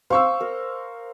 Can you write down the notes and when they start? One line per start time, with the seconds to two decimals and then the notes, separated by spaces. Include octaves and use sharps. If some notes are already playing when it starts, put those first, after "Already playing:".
0.10 C5 F5 C#6 E6
0.41 A#4